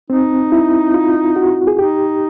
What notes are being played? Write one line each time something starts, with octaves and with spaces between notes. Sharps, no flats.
C4 D#4
E4
F4
F#4
G#4
D#4 G4